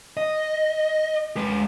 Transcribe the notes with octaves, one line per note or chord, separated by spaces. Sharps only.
D#5
G#3 B4